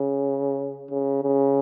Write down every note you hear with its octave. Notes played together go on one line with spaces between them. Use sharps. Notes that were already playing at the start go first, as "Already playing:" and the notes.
Already playing: C#3
C#3
C#3